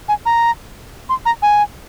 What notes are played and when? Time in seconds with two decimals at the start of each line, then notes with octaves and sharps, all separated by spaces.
0.08 G#5
0.26 A#5
1.09 C6
1.26 A#5
1.42 G#5